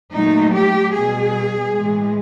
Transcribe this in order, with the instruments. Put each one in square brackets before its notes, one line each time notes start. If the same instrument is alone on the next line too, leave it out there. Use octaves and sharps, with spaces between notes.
[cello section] A#2 F#3 A3 D#4
G4
B2 G3 G#4
A2 E3 G#3